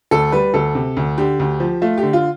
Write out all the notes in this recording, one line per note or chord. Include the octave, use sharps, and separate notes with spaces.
D2 A4
G3 B4
D2 A4
C3
D2
D3 G4
D2
F3
A3 F4
G4
D3
F4